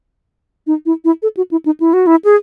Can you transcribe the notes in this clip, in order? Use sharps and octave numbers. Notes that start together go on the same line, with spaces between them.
D#4
E4
E4
A4
F#4
E4
D#4
E4
F#4
E4
G#4